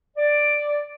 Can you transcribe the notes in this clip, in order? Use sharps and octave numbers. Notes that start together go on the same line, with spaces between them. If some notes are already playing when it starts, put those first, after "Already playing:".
D5